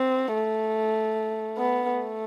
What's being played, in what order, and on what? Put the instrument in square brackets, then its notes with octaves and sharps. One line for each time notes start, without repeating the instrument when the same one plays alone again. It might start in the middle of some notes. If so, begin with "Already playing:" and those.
Already playing: [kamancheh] C4
A3
B3
A3